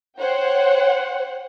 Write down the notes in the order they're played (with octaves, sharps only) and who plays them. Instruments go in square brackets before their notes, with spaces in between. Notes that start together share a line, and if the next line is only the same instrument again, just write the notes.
[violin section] C5 C#5 F#5 G5